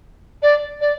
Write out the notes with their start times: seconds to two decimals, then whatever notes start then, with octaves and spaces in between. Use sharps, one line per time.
0.42 D5
0.81 D5